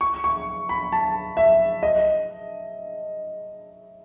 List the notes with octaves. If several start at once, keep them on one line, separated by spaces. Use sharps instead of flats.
C#6
C#6
B5
A5
E5
D#5